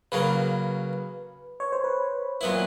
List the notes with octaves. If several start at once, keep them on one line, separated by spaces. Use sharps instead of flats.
C#3 F#3 A#3 B4
C#5
C5
B4
A#2 F#3 B3 E4